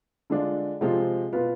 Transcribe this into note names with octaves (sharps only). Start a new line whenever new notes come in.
D3 G#3 D4 F4
C3 F3 G#3 C4 F4
B2 B3 F4 B4